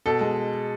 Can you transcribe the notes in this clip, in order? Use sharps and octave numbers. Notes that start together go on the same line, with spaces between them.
B2 A4
G#3